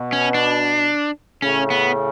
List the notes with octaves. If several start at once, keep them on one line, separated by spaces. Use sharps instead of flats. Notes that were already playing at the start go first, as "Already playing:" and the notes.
Already playing: B2
C#4
D4
A2 C#3 C#4
B3